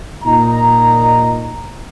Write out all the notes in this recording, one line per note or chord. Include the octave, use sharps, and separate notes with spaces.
A#2 D#4 A#5